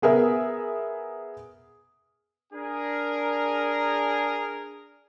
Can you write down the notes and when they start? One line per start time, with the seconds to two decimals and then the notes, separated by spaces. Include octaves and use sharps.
0.02 B3 G#4 A#4 E5
2.53 D4 G#4 A#4